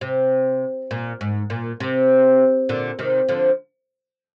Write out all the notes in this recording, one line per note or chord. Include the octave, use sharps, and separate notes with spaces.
C3
A#2
G#2
A#2
C3
A#2 D3
C3 D#3
D3 F3